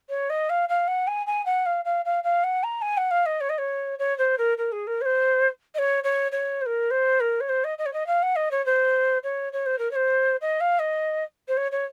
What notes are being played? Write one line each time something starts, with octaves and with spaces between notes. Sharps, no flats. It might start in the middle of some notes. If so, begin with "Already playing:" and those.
C#5
D#5
F5
F5
F#5
G#5
G#5
F#5
F5
F5
F5
F5
F#5
A#5
G#5
F#5
F5
D#5
C#5
D#5
C#5
C#5
C5
A#4
A#4
G#4
A#4
C#5
C5
D#5
C#5
C#5
C#5
C5
A#4
C5
A#4
C#5
C5
D#5
D#5
C#5
D#5
F5
F#5
D#5
C#5
C5
C#5
C#5
C5
A#4
C#5
C5
D#5
F5
D#5
C5
C#5
C#5